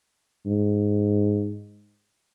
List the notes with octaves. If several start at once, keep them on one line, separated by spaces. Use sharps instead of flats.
G#2